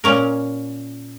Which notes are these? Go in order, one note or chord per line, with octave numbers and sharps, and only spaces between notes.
A#2 C#4 A#4